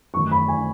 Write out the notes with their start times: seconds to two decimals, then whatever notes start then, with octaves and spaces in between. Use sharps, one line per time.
0.14 F#2 D#3 A3 C#6
0.32 B5
0.48 G#5